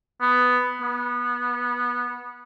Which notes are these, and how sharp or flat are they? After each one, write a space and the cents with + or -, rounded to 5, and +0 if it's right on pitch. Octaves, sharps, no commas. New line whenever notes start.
B3 +5
B3 -20